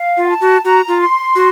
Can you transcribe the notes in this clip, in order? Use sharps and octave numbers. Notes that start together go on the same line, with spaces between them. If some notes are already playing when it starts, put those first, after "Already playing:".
Already playing: F5
F4
F#5
A5
F#4
F#4 A#5
F4
C6
F#4